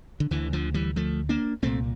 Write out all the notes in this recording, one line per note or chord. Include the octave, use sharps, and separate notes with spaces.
D3
D2 D3 E3
D3 F3
E3 G3
F3 A3
A#3 D4
C2 A#2 A3 C4